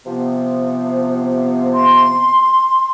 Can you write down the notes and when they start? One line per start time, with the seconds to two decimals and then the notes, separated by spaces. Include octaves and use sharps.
0.06 C3 F3 B3
1.73 C6